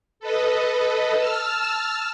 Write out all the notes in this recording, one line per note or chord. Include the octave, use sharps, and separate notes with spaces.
A4 B4 D#5
A5 E6 F6